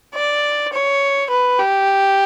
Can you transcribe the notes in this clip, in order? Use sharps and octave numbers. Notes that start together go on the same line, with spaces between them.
D5
C#5
B4
G4